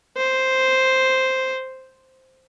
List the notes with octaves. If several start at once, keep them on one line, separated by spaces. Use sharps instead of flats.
C5